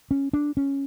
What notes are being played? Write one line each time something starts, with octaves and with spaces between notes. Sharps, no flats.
C#4
D4
C#4